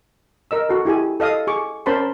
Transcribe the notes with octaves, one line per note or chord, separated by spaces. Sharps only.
A#4 D#5 E6
F#4 A4
E4 G4 G#4 G#5
A4 D#5 F5 D#6
G#4 C#6 D6
C#4 A#4 C5 A5 B5 C6